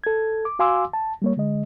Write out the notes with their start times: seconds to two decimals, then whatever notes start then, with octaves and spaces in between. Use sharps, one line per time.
0.04 A4 G#6
0.45 D6
0.59 F#4 F5 G#5 C6 D6 E6
0.93 A5
1.22 G3 A#3 C#5
1.37 D3 G#3 D#5